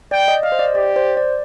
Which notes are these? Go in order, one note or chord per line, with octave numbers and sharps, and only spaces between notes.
D5 G5
D#5
D#5 F5
C5
D5
G4 D5
C5
D5